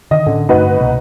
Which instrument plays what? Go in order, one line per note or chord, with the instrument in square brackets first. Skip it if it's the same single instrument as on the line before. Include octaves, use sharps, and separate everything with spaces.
[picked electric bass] D3 D#3 [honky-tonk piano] D#5
[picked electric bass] A2 C#4 [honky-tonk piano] D3
[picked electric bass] G2 D3 A3 [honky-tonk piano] D#4 F#4 B4
[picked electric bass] C2 B2 A#3